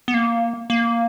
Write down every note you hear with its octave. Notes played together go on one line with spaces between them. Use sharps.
B3
A#3
A#3